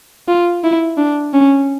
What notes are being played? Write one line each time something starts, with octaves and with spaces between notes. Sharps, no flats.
F4
E4
D4
C#4